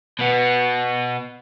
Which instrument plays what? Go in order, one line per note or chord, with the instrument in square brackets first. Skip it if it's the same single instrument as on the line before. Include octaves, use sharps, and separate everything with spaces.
[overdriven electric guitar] B2 B3